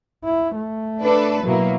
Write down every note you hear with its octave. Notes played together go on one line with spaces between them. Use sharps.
E4
A3
D4 A4 B4
B2 F#3 A#3 E4